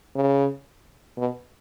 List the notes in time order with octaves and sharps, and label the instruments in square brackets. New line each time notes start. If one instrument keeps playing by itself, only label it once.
[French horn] C#3
B2